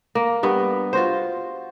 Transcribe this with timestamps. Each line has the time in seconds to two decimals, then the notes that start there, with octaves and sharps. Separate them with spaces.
0.15 A#3
0.43 G2 B3 B4
0.93 F4 F#4 C5